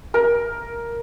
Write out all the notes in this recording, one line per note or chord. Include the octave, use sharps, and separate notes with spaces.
A#4